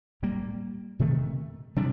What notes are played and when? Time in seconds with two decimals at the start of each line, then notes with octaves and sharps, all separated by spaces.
0.22 A2 G3 A#3
0.99 C3 D#3 A3
1.76 C3 G3 D4